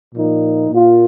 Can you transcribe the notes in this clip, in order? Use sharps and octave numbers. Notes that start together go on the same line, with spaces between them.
A#2 F3 A#3 D#4
A#2 A#3 F4